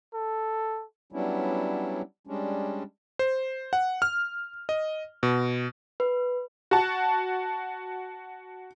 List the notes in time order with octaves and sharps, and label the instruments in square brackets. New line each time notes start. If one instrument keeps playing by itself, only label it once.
[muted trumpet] A4
[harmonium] F#3 G3 B3 C#4 D4 E4
G3 G#3 C#4 D4
[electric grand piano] C5
F#5
F6
D#5
B2
[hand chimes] B4
[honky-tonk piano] F#4 A5